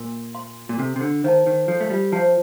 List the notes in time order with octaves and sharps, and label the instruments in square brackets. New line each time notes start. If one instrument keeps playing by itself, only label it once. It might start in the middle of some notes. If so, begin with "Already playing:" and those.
Already playing: [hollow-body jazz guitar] A#2 [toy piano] A#4
[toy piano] F5 C6
[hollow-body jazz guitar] A#2
[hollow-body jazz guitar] C3 [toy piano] A4
[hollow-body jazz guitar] C3
D3
[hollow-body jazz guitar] D#3 [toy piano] C5 F5 A5
[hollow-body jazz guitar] D#3
[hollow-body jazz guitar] F3 [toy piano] A4
[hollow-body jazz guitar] A3
G3
[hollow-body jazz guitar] F3 [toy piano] C5 F5 A5